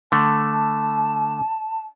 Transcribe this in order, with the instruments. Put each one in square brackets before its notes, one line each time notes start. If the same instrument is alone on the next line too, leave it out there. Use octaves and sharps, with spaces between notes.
[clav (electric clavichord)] D3 A3 [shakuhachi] A5